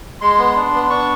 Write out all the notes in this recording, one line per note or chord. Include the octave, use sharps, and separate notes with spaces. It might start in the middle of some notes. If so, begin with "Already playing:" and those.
G#3 C6
B3
D4
B3
C6
D4 C#6